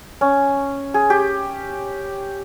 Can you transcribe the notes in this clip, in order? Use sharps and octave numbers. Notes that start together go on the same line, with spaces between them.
C#4
G#4
G4